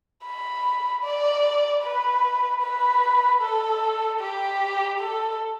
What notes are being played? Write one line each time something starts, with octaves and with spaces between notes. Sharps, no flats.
B5
D5
B4
B4
A4
G4
A4